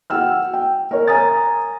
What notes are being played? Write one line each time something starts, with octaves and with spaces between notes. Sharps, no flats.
F#4 F#5 G5 E6 F6
G5
A#4 C#5
G#5 A#5 D#6 A6